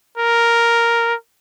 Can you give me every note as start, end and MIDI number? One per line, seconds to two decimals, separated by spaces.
0.18 1.14 70